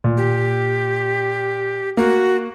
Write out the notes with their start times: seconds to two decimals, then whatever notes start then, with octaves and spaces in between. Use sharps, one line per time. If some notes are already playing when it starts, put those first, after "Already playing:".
0.04 A#2
0.17 G4
1.97 A#3 F#4